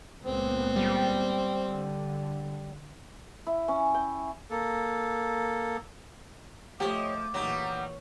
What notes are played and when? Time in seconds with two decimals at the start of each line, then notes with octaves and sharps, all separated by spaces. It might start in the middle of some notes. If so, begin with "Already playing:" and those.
0.25 C#2 A#2 B3 C4
0.76 G3
1.68 D3
3.47 E4
3.68 C#4
3.94 G5
4.50 A#3 A4
6.80 F3 A3 G4 C#5 D#5 D6
7.34 A#1 E3 F#3 G3 D#4 C#5